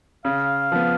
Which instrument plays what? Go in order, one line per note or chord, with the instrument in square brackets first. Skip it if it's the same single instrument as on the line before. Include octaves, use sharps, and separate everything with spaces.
[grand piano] C#3 [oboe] F5
[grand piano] F3 B3